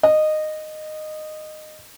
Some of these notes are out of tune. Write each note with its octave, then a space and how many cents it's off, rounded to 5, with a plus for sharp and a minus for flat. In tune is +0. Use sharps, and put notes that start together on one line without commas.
D#5 -15